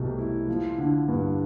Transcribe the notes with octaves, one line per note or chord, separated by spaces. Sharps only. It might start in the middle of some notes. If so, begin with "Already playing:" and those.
Already playing: C2 B2 A3
E4
F3
D3
G2